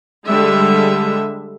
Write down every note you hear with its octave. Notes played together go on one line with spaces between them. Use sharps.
D3 G3 G#3 E5